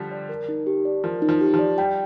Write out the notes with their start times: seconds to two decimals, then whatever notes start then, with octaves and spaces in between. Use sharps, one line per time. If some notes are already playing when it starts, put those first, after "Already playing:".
Already playing: D3 F3 G3
0.11 D5
0.29 A#4
0.49 D#4
0.67 G4
0.85 D5
1.04 F3 A#4
1.22 D#4
1.29 F3
1.41 G4
1.54 F3
1.59 D5
1.78 G3 G5